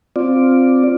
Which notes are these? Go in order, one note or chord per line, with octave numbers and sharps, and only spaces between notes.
C4 F4 D5